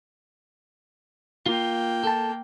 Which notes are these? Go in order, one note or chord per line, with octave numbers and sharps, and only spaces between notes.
A#3 F4 G5
A4 A5